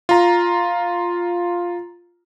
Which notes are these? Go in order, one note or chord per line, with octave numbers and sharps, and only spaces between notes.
F4 A#5